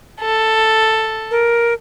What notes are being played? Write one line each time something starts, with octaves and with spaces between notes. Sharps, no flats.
A4
A#4